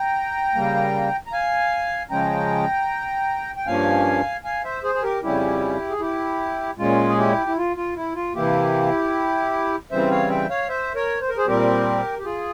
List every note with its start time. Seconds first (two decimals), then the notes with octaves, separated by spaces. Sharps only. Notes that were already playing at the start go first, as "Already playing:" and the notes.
Already playing: G5 A#5
0.55 C#3 G3 A#3
1.26 A#5
1.33 F5 G#5
2.10 C#3 F3 G#3 C#4 G5 A#5
3.57 G5
3.67 G2 F3 A#3 C#4 F5 G#5
4.44 F5 G#5
4.64 C5 E5
4.84 G#4 C5
4.95 G#4
5.03 G4 A#4
5.23 F2 C#3 G3 C#4 E4 G4
5.90 G#4
6.00 E4 G4
6.78 A#2 G#3 C#4 F4
7.10 G#4
7.17 E4 G4
7.47 E4
7.57 F4
7.77 F4
7.96 E4
8.15 F4
8.35 C3 E3 A#3 E4 G4
9.91 C#3 E3 G3 C4 C5 E5
10.11 C#5 F5
10.30 E5 G5
10.50 C#5 F5
10.69 C5 E5
10.95 A#4 C#5
11.21 C5
11.29 A#4
11.37 G#4 C5
11.47 A#2 G3 C4 G4 A#4
12.19 G4
12.25 F4 G#4